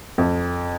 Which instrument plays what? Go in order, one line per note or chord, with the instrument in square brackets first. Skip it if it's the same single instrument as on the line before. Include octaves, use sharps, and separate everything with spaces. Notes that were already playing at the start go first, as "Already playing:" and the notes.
[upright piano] F2